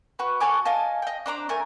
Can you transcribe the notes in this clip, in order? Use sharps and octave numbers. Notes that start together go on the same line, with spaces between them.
F#4 B4
F#4 A4 G#5 D6
D#5 F5 G#5 A5
D#5 G5
D4 C5 A#5 D6
A3 A#4 G#5